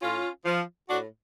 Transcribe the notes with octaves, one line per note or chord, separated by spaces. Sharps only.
A2 C#4 F4
F3
A2 D4 F#4